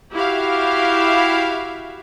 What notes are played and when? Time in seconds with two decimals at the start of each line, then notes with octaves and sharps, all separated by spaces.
0.12 E4 F#4 G4 E5 F5